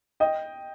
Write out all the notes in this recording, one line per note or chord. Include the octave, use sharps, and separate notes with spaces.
D#5 G5